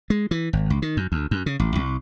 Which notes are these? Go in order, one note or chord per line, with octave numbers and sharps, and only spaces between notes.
G#3
E3
G#1
C#2
D#3
F#2
D2
F#2
C#3
A1
C2